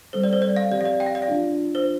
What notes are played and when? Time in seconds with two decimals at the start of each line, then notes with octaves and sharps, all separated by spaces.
0.13 G3 C4 A4 C5
0.24 D5
0.33 C5
0.42 D5
0.56 F5
0.71 F3 C4 G4 D5
0.81 F5
0.85 D5
1.00 G5
1.06 F5
1.15 D5
1.22 F5
1.28 F3 D4 F4
1.75 C5